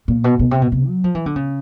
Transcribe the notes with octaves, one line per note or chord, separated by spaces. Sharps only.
A#2
B2
B2
C3
B2
C3
F#3
F3
E3
D3
C#3